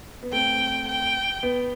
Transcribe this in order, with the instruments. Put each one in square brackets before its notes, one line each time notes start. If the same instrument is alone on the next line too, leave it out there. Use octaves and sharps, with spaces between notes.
[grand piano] B3
[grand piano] A3 C4 [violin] G5
[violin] G5
[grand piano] B3